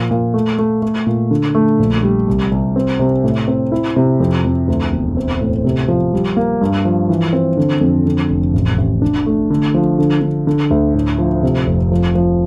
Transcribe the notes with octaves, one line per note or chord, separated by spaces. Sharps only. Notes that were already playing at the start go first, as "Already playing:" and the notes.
Already playing: A#2 F3
A#2
A3
A3
A3
A#2
D3
A3
A#1
G3
C2
C2
C4
C3
A2
C4
E4
C3
F2
F2
D2
E1
C4
A2
C3
F3
G3
A#3
G2
F3
E3
C4
D3
F2
D3
F1
A1
A1
D4
A3
D3
F3
D3
D3
D3
D2
A2
F3
C3
F1
F3
F3